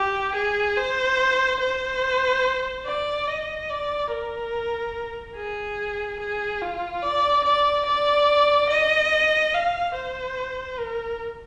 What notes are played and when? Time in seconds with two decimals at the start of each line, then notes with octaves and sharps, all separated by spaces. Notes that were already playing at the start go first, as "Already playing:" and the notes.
Already playing: G4
0.35 G#4
0.77 C5
1.60 C5
2.85 D5
3.27 D#5
3.69 D5
4.11 A#4
5.36 G#4
6.20 G#4
6.62 F4
7.02 D5
7.44 D5
7.86 D5
8.69 D#5
9.54 F5
9.95 C5
10.78 A#4